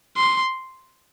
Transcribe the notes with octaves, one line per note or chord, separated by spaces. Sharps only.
C6